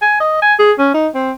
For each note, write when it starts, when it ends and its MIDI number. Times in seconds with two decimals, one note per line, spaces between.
0.02 0.16 80
0.20 0.38 75
0.42 0.54 80
0.59 0.72 68
0.79 0.90 61
0.94 1.08 63
1.15 1.32 60